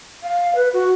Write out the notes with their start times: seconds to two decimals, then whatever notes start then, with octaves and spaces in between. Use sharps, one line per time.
0.23 F5
0.55 B4
0.73 F#4